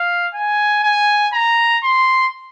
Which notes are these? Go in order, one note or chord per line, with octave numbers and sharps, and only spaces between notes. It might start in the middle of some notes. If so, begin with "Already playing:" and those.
Already playing: F5
G#5
G#5
A#5
C6